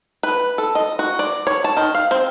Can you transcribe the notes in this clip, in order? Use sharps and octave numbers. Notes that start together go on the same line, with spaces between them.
B4
A4
D#5
F#4
D5
C#5
A5
D#3
F5
C4